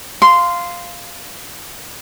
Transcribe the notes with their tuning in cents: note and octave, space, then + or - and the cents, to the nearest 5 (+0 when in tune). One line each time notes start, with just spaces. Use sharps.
F5 +0 C6 -10